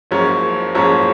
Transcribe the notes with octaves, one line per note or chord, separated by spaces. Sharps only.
F#1 F#2 F3 G#3 C#4 C#5
F#1 F#2 F3 G#3 C#4 C#5